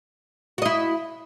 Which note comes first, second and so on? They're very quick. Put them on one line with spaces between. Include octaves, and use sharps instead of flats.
F#4 D#5 E4